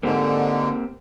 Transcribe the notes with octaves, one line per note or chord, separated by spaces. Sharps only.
G#2 D3 A#3 C4 G4